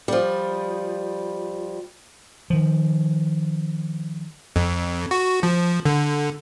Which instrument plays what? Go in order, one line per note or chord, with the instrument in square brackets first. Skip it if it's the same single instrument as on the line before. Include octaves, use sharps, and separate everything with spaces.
[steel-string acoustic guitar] F3 G3
[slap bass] D#3 F3
[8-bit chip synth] F2
F#4
F3
D3